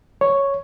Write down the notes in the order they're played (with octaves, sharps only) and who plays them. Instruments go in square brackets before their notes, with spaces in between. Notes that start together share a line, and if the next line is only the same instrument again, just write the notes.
[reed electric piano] C#5